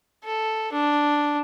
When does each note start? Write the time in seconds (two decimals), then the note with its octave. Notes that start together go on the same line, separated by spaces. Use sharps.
0.24 A4
0.72 D4